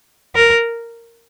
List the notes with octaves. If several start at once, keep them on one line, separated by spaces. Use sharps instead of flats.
A#4